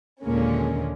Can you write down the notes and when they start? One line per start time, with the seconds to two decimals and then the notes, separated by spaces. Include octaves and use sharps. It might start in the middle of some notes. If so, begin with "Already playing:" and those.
0.23 D#2 A#2 D3 G#3 A#3 C#4